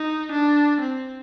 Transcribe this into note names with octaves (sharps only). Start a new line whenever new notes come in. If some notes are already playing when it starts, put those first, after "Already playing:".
Already playing: D#4
D4
C4